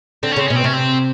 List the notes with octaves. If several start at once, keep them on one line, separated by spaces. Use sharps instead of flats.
D3 C4
C#4
C#3 C4
B2 C#4
C4
C3 C#4
C4